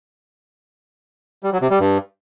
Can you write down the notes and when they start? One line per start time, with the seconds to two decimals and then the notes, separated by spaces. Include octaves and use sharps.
1.43 G3
1.52 F#3
1.61 C3
1.70 G3
1.80 G2